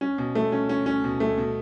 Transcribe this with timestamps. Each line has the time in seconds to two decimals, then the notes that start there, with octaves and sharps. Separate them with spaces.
0.01 C#4
0.18 B2
0.35 A3
0.52 C#4
0.69 C#4
0.86 C#4
1.04 B2
1.20 A3
1.38 B2